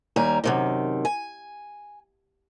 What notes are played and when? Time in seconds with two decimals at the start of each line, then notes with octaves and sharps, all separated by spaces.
0.16 D#2 G3 G#5 A#5
0.44 F#2 C3 D#3
1.05 G#5